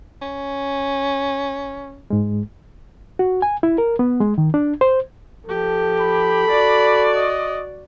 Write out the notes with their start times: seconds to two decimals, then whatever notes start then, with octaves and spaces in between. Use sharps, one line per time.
0.22 C#4
2.10 G#2 G#3
3.19 F#4
3.42 G#5
3.63 E4
3.78 A#4
3.99 B3
4.20 G#3
4.38 D#3
4.54 D4
4.81 C5
5.47 F3 G4 A4
6.00 B5
6.50 F#4 D5
7.15 D#5